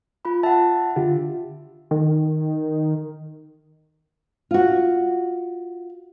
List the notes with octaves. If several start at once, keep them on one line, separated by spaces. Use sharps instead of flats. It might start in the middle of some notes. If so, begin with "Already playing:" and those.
F4 B5
E5 F#5 A5
D3 F4 G4
D#3
F4 F#4